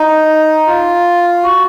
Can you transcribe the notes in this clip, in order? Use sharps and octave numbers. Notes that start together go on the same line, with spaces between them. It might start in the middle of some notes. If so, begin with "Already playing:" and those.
Already playing: D#4
F4
F#4